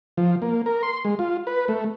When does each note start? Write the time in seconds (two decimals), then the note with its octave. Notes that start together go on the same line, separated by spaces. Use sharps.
0.17 F3
0.42 A#3
0.66 A#4
0.83 C6
1.05 G#3
1.19 F4
1.47 B4
1.68 A3